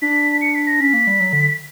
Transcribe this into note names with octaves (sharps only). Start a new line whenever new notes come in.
D4 B6
C#7
B6
A#6
C#4 B6
A#3
G3
F#3
D3